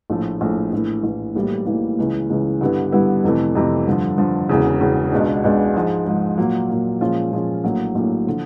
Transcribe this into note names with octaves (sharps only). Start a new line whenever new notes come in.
A#1 A2 F3 A3
A#1 A2 F3 A3
A#1 A2 E3
A#1 A2 E3
B1 A2 E3 G3 A#3
B1 A2 E3 G3 A#3
C#2 C#3 E3
C#2 C#3 E3
G2 D3 G3 B3 E4
G2 D3 G3 B3 E4
F2 C3 E3 A3
F2 C3 E3 A3
G2 D3 F3
G2 D3 F3
E1 E2 C#3
E1 E2 C#3
C#2 B2 G#3 B3 D4
C#2 B2 G#3 B3 D4
G#2 F3 G#3
G#2 F3 G#3
A#2 F#3 A#3
A#2 F#3 A#3
A#2 F3 G#3 C#4 F4
A#2 F3 G#3 C#4 F4
A#1 A2 F#3 A#3
A#1 A2 F#3 A#3
D3 F3